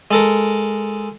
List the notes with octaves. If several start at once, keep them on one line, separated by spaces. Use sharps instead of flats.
G#3 A4 A#4